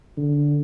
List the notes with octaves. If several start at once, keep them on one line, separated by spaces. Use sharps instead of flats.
D3